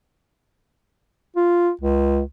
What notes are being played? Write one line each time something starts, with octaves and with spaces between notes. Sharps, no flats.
F4
C#2